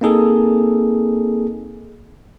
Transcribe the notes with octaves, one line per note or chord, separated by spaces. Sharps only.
A#3 C4 D#4 G#4 A4